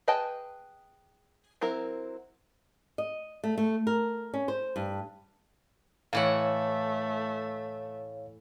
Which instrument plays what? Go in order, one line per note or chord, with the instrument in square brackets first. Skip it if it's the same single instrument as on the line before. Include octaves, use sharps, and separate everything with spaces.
[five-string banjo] G#4 B4 D#5 G5 A5
F#3 C4 E4 A#4
[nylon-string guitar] D#5
A3
A3
A#4
C#4
C5
G2
[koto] A2 E3 F#5 [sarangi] A3 [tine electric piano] C#5 F5